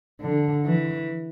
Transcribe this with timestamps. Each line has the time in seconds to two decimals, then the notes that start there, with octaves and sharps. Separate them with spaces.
0.20 D3
0.65 E3